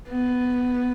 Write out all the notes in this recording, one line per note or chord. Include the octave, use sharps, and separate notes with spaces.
B3